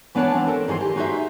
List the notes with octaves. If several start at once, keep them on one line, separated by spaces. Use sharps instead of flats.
E3 B3 D4 C#5 F#5 A5
E3 C4
A4 A#4
D#3 E3 G#4 C5
G4
D#4 F#4 G#4 A4 C5 E5